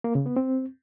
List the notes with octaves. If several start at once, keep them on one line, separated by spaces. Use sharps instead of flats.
A#3
C#3
B3
C4